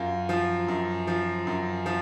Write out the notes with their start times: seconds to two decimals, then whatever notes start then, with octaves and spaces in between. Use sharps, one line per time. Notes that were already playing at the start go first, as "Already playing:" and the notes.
Already playing: F#2 F4
0.29 F3
0.68 F#2
1.07 F3
1.47 F#2
1.86 F3